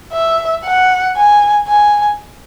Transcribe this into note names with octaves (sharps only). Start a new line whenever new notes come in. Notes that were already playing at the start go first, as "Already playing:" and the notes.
E5
F#5
G#5
G#5